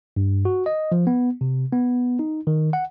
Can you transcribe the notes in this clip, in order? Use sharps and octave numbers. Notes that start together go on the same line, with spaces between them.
G2
F#4
D#5
F3
B3
C3
B3
D#4
D#3
F#5